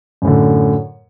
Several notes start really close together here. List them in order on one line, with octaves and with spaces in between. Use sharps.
F#2 A2 D3